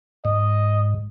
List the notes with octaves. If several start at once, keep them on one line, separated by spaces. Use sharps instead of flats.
G#2 D#5